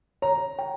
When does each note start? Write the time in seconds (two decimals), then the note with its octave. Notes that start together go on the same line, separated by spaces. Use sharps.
0.22 C#5 A#5
0.59 G5